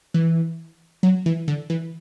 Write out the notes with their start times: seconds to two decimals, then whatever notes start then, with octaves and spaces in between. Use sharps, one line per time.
0.14 E3
1.03 F#3
1.26 E3
1.48 D3
1.70 E3